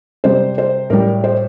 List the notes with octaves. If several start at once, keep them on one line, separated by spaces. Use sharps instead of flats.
C3 G3 C5
C5
A2 G3 A#4
C5